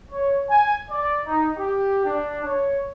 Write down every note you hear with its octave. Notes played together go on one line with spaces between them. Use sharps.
C#5
G#5
D5
D#4
G4
D4
C#5